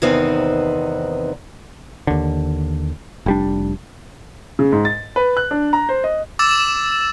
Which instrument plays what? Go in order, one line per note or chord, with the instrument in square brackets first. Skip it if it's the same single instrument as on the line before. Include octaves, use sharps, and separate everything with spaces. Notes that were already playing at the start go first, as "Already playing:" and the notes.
[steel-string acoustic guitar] E2 C3 D#3 B3 C4 D#4
[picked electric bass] D#2 D3
F1 G3 D4
[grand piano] C#3
G#2
A6
B4
F#6
D4
A#5
C5
D#5
[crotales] D6 E6 A6 E7